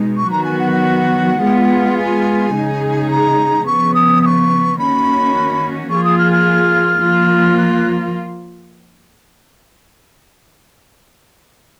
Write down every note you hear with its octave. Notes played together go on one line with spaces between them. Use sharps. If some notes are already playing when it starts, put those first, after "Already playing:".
Already playing: B2 G#3 D#4
C#6
D#3 F#3 B3 F#4 A#5
G#5
F#5
F#5
G#3 B3 F4 G#4
G#5
C#3 G#3 D#4 G#4
A#5
C#3 F3 B3 C#6
D#6
D#6
C#6
D#3 A#3 C#4 F#4 B5
F3 A#3 F4 G#4 C#6
D#6
F6
F6
F3 A#3 F4
F#6